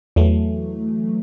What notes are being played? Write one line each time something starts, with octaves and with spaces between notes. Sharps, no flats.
E2 E3 F#3 A3